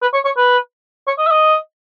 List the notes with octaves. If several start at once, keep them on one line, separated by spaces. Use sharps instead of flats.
B4
C#5
C#5
B4
C#5
D#5
E5
D#5